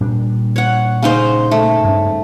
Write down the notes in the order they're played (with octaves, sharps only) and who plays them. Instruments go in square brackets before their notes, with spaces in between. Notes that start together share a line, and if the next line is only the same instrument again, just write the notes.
[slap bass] A#2 G3 D4
[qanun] C#5 F#5
C#3 D#4 C5
A3
[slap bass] G2 C4 C#4